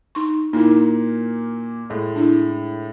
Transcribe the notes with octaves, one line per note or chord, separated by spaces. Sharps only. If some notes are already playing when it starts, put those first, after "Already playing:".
D#4 C6 C#6
A#2 A#3 D#4 E4
A2 G#3
D4 E4